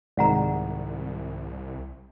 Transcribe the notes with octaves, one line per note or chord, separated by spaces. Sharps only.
C2 G#2 C3 D#3 D5 F#5 A#5